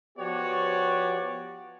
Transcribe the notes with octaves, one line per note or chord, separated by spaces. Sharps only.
F3 B3 F#4 G4 C#5 D5